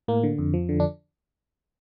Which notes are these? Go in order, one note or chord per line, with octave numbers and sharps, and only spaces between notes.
A2 A#3
D3
F2
F3
D3
D4